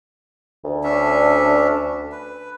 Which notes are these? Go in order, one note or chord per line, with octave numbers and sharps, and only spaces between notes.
D2
C#4 D4 E5
B4